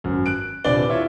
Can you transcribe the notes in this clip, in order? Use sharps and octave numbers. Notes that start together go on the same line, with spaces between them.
G#1 F#2
F#6 D7
D#1 C3 D4 B4 D5 G7
E4 F4 C#5 E5